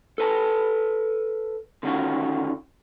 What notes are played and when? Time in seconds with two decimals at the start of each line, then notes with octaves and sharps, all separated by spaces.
0.18 A4 B4 A5
1.83 D3 D#3 C#4 D#4 F4 F#4